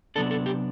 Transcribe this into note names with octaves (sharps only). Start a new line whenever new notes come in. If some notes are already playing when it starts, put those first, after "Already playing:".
C3 F#3 B3 D4 A4
A4
G4